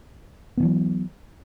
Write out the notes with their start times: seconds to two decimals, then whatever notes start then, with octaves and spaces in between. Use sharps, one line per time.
0.57 B3
0.60 D#3
0.63 E3
0.65 F#3